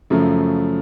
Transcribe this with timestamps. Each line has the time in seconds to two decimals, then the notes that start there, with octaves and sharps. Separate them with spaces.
0.10 F#2 C#3 F3 A3